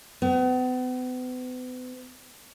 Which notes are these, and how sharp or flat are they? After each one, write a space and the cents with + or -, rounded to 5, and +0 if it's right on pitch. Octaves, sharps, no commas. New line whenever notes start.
B3 +40